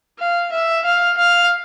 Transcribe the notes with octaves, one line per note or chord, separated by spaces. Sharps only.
F5
E5
F5
F5